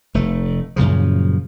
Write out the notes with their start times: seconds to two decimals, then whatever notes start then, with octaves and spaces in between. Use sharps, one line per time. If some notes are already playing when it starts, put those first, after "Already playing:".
0.14 F1 A3
0.76 F#2 A#2 C#3 F3